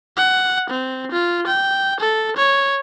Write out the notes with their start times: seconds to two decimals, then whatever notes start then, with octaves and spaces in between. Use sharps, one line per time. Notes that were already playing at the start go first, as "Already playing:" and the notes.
0.17 F#5
0.70 C4
1.12 F4
1.47 G5
2.00 A4
2.37 C#5